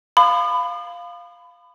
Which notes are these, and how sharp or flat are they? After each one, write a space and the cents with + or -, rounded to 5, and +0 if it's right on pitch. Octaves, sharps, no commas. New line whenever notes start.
F5 +0 B5 +25 D#6 -40